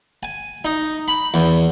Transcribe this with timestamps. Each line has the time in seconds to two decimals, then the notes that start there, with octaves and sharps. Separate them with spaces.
0.23 G#5
0.65 D#4
1.08 B5
1.34 E2